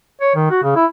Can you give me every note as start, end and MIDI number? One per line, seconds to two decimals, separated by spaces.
0.21 0.35 73
0.35 0.49 51
0.50 0.62 66
0.63 0.75 49
0.76 0.86 64